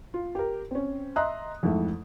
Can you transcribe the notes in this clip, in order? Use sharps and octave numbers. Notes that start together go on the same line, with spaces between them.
F4
G4 A#4
C4 C#4
D#5 E5 A#5 C6 D#6 F#6
F2 G#2 E3 A3